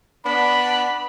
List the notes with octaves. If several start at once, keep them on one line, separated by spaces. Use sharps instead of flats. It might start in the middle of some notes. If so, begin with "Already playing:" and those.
B3 D4 B5